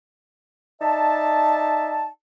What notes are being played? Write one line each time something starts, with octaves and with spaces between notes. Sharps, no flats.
D#4 D5 E5 A5